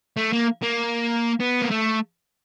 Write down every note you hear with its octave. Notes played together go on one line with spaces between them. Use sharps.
A3
A#3
A#3
B3
A#3
A3